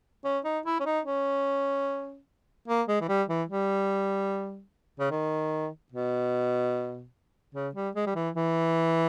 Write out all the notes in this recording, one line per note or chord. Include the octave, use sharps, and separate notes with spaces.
C#4
D#4
E4
C#4
D#4
C#4
A#3
G#3
E3
G3
E3
G3
C#3
D#3
B2
C#3
G3
G#3
G3
E3
E3